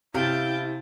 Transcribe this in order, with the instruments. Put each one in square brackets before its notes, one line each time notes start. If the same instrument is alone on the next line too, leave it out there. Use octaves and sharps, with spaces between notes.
[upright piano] C3 [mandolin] C#4 F5 [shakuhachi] E4 [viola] G5 A5